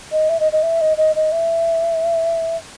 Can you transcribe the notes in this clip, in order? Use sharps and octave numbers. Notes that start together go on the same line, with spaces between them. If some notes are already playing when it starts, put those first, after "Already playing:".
D#5
E5
D#5
D#5
E5
D#5
D#5
D#5
E5